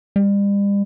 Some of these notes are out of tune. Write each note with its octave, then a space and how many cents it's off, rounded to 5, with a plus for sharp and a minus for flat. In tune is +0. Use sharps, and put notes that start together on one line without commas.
G3 +40